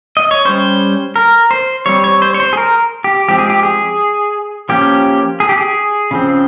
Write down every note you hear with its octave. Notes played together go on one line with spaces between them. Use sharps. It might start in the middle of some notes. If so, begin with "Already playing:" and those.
D#5
C#5
G3 C#4 C5
A#4
C5
G3 C4 C#5
C#5
C5
C#5
C5
G#4
A#4
G4
F3 G#3 C4 G4
G#4
G4
G#4
F3 A#3 C#4 G4
G#4
G4
G#4
C#3 F3 C4